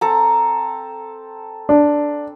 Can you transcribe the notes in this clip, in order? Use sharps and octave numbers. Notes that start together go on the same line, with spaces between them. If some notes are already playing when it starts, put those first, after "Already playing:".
C4 A4 A#5
D4